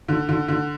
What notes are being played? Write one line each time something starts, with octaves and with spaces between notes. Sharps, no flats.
D3
D3
D3